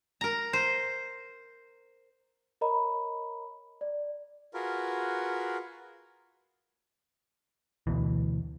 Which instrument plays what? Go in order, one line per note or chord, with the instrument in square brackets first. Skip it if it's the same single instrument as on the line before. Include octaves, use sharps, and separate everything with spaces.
[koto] A#4 A#5
C5
[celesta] A#4 C#5 D#5 A#5 B5
D5
[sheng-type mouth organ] F4 F#4 G#4 A#4 B4
[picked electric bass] D2 B2 E3